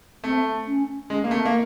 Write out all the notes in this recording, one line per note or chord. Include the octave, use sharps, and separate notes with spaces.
A3 C4
C#4
G#3 C#4
A#3
A3 C4
A#3